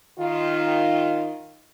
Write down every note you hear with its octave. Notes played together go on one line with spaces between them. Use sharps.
D#3 F4